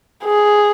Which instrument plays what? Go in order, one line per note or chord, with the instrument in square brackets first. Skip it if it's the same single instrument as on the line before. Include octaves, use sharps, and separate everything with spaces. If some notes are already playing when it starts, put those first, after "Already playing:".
[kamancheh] G#4